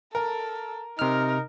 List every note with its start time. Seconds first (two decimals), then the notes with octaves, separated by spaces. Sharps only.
0.15 A4 A#4
0.99 C3 D#4 A#4 F6